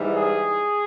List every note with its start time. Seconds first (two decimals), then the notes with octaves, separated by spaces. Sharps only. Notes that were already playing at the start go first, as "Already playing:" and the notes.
Already playing: G#2 E3 G3
0.14 G#4